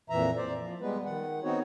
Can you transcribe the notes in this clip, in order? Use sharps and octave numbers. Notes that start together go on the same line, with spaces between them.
F2 A#2 E3 E5 A#5
C5 D5
F3
G3 G#3 B3 B4
D#3 F#5
B3 C4 D#4 F#4 C#5